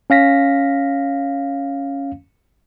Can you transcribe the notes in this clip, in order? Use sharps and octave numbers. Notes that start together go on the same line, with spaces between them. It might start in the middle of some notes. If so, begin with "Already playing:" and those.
C#4 F5 A#6 B6